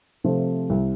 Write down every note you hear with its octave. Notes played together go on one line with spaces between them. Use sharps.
C3 F3 A3 C4
C2